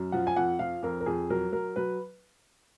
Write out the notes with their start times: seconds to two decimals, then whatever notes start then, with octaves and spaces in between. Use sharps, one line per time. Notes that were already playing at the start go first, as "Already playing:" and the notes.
Already playing: F#2
0.12 F3 F#5
0.27 G#5
0.36 F2 F#5
0.59 F3 F5
0.83 F2 A#4
1.01 A#4
1.06 F2 G#4
1.30 F#3 A#4
1.53 F#3 A#4
1.76 F#3 B4